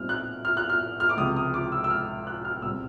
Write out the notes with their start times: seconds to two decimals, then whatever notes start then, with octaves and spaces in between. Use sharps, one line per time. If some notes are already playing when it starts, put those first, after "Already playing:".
Already playing: A#2 G3 C4 D#4 F6
0.09 F#6
0.45 F6
0.57 F#6
0.70 F6
1.00 F6
1.09 D6
1.17 C#2 C3 F3 D#6
1.36 D#6
1.54 D6
1.72 E6
1.84 E6
1.90 F6
2.27 F#6
2.45 F6
2.62 C2 A#2 G3 C4 E6